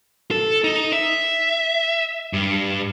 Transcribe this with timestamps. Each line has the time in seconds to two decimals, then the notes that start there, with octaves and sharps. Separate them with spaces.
0.31 A4
0.64 D#4
0.93 E5
2.33 G2